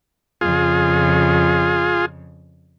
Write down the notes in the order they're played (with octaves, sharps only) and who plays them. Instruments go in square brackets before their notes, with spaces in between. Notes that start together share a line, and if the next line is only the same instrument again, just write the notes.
[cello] F2 C#3 [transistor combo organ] F4 G#4